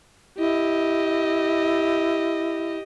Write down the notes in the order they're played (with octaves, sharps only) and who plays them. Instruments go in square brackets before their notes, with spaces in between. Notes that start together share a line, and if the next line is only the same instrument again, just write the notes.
[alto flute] E4 [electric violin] G4 D#5